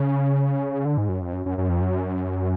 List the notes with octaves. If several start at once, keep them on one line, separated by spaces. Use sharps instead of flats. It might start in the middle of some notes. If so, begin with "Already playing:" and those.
Already playing: C#3
D3
G#2
F#2
F2
F#2
F#2
F#2
F2
F#2